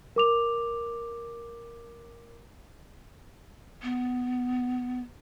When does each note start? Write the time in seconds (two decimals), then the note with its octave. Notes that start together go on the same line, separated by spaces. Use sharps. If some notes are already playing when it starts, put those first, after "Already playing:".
0.16 A#4 D6 F7
3.83 B3